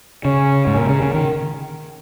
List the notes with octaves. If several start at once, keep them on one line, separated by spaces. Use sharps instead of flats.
C#3 C#4
G#2
A#2 A#4
C#3
C#3
D#3